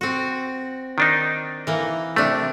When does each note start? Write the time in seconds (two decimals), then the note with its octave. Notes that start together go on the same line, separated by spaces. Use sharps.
0.01 C4 F#4
0.98 D#3 D4 D#4
1.67 E3 A#3
2.16 C3 A3 D4